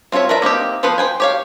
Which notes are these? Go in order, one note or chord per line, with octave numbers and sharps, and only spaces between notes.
C4 F4 G#4 C#5 E5
A#4 B4 D5 E5 A#5
A#3 C4 D#4 G4
F3 B3 F4 B4 C5
C5 G5 G#5
G4 C#5 F5